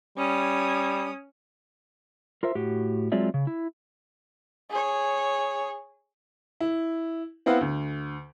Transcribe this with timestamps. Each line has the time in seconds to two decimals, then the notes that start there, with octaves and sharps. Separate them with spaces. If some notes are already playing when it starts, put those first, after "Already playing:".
0.18 G3 C#4 D#6
2.43 F4 A#4 C5 E5
2.55 A2 F#4 G4
3.12 F#3 G#3 C4 F4 D5 E5
3.34 C#3
3.47 E4
4.71 G#4 C#5
6.61 E4
7.46 B3 C4 E4 B4 F5 F#5
7.61 D2